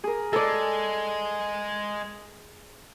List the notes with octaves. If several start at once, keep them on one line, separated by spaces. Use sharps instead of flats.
G#4 A#4
G#3 A4 D5